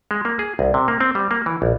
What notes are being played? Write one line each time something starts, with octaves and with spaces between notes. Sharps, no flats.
G#3
A#3
G#4
C2
C3
A#3
C4
G3
A#3
E3
A#1